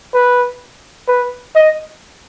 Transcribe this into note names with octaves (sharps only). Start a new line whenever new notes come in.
B4
B4
D#5